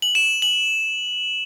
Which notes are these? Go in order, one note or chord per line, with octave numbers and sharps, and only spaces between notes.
F#7
E7
F#7